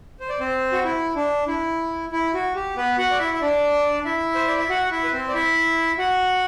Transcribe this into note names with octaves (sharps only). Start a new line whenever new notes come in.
C5
D5
C4 C5
F#4
E4
D4
E4
E4
F#4
G4
B3 B4
F#4 F#5
D5
E4 E5
E5
D4 D5
E4 E5
C5
D5
E5
F#4 F#5
E4 E5
B4
C4 C5
D5
E4 E5
F#4 F#5